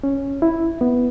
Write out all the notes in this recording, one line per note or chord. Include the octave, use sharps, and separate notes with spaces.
C#4
E4
B3